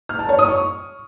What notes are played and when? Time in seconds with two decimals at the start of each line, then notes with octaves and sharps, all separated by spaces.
0.09 F6
0.19 A5
0.29 C#5
0.39 D#6
0.48 C#6